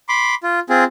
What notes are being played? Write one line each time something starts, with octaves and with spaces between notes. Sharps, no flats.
B5 C6 D6
F4
C4 F4 G#4